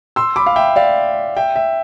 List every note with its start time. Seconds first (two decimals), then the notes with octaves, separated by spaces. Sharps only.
0.16 C6 E6
0.36 B5 D6
0.46 F5
0.56 E5 G5
0.76 D5 F5
1.37 E5 G5
1.56 E5